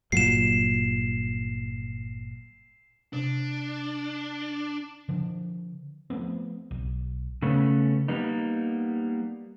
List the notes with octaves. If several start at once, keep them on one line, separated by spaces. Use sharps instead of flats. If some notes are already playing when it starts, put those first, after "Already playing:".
G1 A#2 F#3 C7 E7
C3 D4
D3 F3
F3 A3 B3 C4
B1
C#3 A3 B3 C#4
G3 A#3 B3 D#4